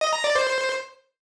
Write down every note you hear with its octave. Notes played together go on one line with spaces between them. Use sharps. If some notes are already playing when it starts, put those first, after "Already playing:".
D#5
A#5
D5
C5